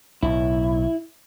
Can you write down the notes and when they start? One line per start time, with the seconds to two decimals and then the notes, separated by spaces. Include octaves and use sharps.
0.23 B1 A2 E4